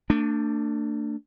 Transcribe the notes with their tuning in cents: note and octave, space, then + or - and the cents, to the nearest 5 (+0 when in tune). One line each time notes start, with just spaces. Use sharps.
A3 +40 D4 +0